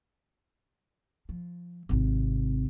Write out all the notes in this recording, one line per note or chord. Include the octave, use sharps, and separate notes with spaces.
F3
G#1 C3